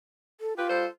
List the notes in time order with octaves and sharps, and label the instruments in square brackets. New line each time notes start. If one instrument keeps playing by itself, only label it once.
[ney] A4
[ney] F4 [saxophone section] G4 B4
[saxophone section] G3 A4 C5